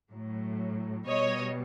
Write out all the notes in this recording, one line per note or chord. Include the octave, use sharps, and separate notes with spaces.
A2 F#3
B2 G3 C#5 D#5